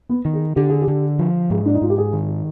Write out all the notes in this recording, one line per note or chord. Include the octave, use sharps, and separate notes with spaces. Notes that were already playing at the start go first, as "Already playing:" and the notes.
B3
D#3
G#4
D3 G4
G#4
G4
D3
F3
G#2 G#4
D4
D#4
G#2 F4
G4
G#4
D#3